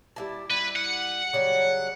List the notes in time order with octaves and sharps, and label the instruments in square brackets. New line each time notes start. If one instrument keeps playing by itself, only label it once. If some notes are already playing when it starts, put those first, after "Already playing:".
[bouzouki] G3 E4 A5
[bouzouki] G3 E4 [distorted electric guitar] B4
[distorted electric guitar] F#5
[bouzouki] C#3 F#3 G3